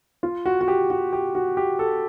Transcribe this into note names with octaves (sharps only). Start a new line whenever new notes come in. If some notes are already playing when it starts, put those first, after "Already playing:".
F4
F#4
F#4
G4
F#4
G4
F#4
G4
A4